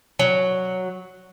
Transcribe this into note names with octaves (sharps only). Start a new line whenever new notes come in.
F#3